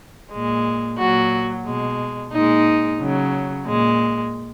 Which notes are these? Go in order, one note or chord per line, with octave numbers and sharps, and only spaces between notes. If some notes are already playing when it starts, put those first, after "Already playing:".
A#2 G#3
A#2 F#3 F#4
B2 G#3
A#2 G#3 D#4
C#3 F#3
A#2 G#3